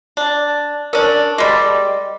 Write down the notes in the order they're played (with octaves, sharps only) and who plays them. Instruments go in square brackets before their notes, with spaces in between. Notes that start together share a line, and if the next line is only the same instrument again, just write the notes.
[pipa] D4
[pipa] C#4 D4 [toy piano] A#4
[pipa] G3 G#3 [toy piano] G#4 D#5